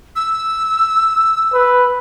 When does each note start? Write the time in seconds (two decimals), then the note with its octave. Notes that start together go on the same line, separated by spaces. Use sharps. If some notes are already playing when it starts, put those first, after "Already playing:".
0.16 E6
1.53 B4